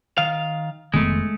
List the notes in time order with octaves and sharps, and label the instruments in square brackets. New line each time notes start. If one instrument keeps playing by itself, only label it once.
[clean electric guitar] D#3 F5
[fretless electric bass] F1 D#3 B3 [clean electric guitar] G#3 A3